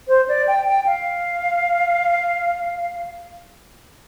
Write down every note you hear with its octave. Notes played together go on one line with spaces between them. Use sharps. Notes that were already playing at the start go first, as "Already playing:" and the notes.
C5
D5
G5
G5
F5